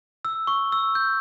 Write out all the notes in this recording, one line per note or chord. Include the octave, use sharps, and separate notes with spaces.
E6
C#6
E6
G6